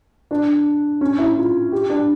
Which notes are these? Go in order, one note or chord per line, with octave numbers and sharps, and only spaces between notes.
D4
C#4
E4
F4
G4
D4